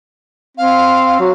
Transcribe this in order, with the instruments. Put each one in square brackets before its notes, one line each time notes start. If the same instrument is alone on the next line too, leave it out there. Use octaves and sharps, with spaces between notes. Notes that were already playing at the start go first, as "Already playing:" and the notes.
[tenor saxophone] C4 [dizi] F5
[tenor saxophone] F#3